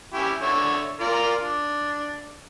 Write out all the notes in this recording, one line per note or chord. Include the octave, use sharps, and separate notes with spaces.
C#4 E4 G4
D3 C#5 E5
F4 A#4 D5
D4